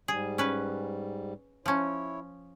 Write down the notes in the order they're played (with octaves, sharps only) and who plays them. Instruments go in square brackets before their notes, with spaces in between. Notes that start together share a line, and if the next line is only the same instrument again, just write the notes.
[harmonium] G#2 G3 [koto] G#4
[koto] C#4 B4
[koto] F3 C#4 [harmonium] E4 C#5